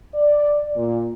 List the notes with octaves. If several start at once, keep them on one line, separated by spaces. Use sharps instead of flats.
D5
A#2